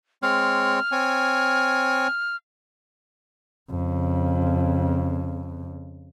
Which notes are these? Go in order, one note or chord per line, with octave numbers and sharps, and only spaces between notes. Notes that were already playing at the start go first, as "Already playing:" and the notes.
G#3 C4 C#5 F6
C4 C#5 G#5
F2 C#3